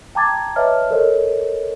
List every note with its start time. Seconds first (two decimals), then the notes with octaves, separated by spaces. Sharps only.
0.15 G5 A5 A#5 D6 G#6 A6
0.56 B4 C#5 D#5 E5 A5 F6
0.90 A4 A#4 C5 C#5 D#5